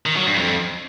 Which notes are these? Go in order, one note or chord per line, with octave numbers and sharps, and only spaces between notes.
D#3
F#3
G2
F2